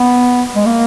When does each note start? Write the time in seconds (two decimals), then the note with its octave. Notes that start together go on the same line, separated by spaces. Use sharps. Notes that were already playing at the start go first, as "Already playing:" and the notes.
Already playing: B3
0.55 G#3
0.66 A#3